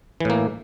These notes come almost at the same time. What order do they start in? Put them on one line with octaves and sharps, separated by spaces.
E3 A2 A#3